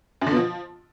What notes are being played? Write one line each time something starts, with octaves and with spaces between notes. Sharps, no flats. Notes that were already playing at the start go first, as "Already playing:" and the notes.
F#2
D3
B2
F3